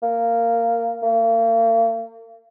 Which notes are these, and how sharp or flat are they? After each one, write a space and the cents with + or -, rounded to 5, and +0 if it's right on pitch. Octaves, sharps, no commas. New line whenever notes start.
A#3 -10
A#3 -40